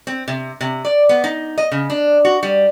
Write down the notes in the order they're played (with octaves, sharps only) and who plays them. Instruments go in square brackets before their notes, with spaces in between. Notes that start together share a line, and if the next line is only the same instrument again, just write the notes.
[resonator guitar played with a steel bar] C4
C3
C3
D5
B3
D#4
D#5
C#3
D4
F#4
G3